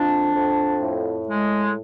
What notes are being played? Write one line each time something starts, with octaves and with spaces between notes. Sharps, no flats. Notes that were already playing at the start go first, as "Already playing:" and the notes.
Already playing: F2 F3 D4
F2
A2
G#3